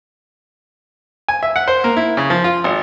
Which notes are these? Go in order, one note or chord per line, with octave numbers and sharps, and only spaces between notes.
G#5
E5
F#5
C5
A#3
E4
C#3
F3
F4
G#1